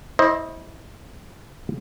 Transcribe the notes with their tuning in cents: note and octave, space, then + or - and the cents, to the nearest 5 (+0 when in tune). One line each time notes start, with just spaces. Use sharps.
E4 -25 C5 +20 D#5 +0